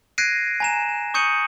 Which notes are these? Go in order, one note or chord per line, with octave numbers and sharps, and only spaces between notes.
F#6 G#6 A#6 C7 D7 D#7
G#5 A#5 E7
C#6 D#6 G6 C#7 D#7 F#7